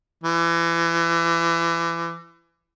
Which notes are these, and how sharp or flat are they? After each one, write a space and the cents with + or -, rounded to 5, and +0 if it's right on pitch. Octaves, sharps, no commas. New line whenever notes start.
E3 +30